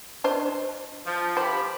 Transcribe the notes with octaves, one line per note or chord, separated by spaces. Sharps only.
D4 C5 D#5
F3
G4 C5 B5